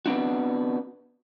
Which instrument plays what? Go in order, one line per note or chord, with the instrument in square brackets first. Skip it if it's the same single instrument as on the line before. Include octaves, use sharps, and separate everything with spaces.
[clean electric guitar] B3 C4 D4 F#4